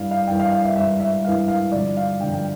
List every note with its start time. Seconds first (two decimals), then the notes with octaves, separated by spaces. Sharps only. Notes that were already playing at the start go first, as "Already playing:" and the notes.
Already playing: G2 E3 F5
0.11 F5
0.28 G2 E3 G5
0.40 F5
0.52 F5
0.63 E5
0.75 G2 E3 E5
1.00 E5
1.25 G2 E3 F5
1.48 F5
1.72 G2 D3 F3 D5
1.97 F5
2.20 G2 D3 F3 G5
2.33 G5